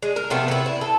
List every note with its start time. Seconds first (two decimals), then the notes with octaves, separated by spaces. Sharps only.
0.02 G#3
0.16 A#4
0.30 C3 F3 A3 B3
0.48 B3 E4
0.66 E4
0.81 A4